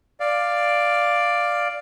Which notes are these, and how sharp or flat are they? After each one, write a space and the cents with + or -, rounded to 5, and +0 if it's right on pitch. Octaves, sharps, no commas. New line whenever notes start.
D5 +5 F5 +0